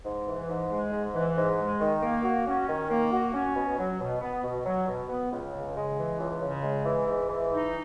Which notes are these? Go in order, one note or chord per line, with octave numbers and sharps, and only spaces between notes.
G#2
E3
G#2
G#3
G#2
E3
G#2
G#3
D#3
A#3
F#4
C#4
D#3
A#3
F#4
C#4
B2
F#3
B2
B3
B2
F#3
B2
B3
C#2
C#3
G#3
E3
C#2
C#3
G#3
E3
G#2
E3
D#4